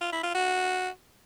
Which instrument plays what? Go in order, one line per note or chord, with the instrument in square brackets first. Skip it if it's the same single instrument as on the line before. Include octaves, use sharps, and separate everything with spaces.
[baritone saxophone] F4
E4
F4
F#4